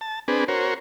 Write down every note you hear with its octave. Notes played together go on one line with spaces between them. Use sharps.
A5
C4 D4 G#4 B4
F#4 A#4 C5 C#5